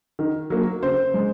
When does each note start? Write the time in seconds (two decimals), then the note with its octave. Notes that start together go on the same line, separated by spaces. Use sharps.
0.19 D#3
0.50 F#3 A#3
0.83 C#3 C5
1.14 G#3